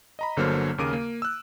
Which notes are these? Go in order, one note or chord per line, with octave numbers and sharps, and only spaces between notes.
D#5 A#5 B5
G1 D3 F#3 A#3 C5 F6
D#2 C#3 A#4 D6 D7 D#7
A#3
E6 F#6